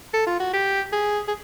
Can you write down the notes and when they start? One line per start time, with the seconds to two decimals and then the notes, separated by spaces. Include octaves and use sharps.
0.14 A4
0.27 F4
0.40 F#4
0.53 G4
0.93 G#4
1.28 G#4